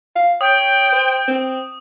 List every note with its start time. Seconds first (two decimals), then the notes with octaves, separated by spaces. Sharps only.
0.16 F5
0.41 C#5 G5 D#6
0.92 C5
1.28 C4